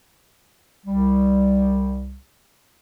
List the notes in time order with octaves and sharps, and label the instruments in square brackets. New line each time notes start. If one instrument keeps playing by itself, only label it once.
[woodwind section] C2 G3